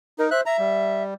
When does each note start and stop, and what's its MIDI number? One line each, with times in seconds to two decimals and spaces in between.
0.19 0.30 63
0.19 0.29 70
0.31 0.42 72
0.31 0.41 76
0.31 0.41 90
0.46 1.04 76
0.46 0.57 82
0.59 1.14 55